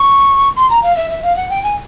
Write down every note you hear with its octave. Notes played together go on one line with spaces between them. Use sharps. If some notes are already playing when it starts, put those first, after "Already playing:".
Already playing: C#6
C6
A#5
F5
E5
E5
F5
F#5
G5
G#5